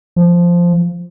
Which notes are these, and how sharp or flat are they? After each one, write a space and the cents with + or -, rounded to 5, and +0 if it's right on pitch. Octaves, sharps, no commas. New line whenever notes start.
F3 -5